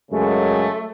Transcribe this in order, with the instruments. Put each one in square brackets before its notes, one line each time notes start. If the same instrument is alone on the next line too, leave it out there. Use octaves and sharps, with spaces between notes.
[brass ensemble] F#2 C#3 G#3 [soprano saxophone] A3